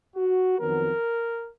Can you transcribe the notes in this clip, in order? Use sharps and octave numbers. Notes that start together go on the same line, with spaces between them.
F#4
F2 D#3 F#3 B3 A#4